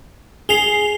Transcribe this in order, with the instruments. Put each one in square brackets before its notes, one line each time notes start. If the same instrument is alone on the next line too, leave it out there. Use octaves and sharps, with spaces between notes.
[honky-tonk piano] G#4 [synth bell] C7 F7 G7